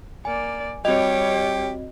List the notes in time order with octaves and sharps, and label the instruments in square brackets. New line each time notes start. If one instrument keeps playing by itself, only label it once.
[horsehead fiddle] A#3 D5 [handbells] G#5
[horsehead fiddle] G3 C#5 [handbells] C4 F#4 D#5 [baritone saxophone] G4